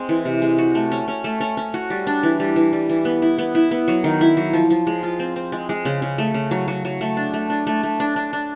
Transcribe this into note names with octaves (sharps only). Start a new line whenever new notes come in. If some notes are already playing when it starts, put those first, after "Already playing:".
Already playing: G#3 C4
E3
C3
G#3
F#4
A3
C#4
C#4
A3
C#4
C#4
F#4
G3
D4
E3
G3
E3
G3
E3
B3
E4
B3
E4
B3
F#3
D#3
E4
F#3
F3
F3
G#3
F4
C4
C4
G#3
G#3
C#3
C#3
A3
C#3
F#3
F#3
F#3
A3
D4
A3
D4
A3
A3
D4
D4
D4